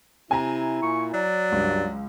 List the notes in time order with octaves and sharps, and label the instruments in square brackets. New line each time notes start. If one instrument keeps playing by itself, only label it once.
[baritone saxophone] C3 [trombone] E4 [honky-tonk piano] G#5 A#5
[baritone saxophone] A#2 [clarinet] C#6
[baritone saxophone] F#3 [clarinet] D5
[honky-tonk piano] C#2 [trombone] G2